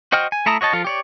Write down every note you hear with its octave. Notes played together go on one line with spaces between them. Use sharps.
F#4 C5 D#5 G5 F6
G#5
A3 E4 A5 A#5 D#6
F#4 C#5 D#5 A5
F3 F4 A4
G4 C#5 D5